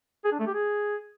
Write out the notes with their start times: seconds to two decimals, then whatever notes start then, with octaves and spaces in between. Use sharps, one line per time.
0.25 G#4
0.32 D4
0.40 A3
0.47 G4
0.55 G#4